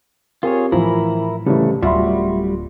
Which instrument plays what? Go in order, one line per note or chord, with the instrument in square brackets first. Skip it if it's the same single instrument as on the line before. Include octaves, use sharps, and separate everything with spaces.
[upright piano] C4 G4 A#4 [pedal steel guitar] F4 G#4 C#5
[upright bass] A2 [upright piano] E3 [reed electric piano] F3 [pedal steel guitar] E4 A#4 B5
[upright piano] C2 [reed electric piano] C#3 E3 [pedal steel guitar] A3
[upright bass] D1 [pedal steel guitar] G3 F#4 [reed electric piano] F4 [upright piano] E5 B5 C6